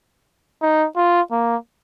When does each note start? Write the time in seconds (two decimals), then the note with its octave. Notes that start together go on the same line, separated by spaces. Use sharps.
0.62 D#4
0.96 F4
1.31 A#3